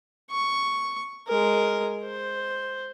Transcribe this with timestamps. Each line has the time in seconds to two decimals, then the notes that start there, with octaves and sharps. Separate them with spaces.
0.31 C#6
1.27 G#3 A#4
2.04 C5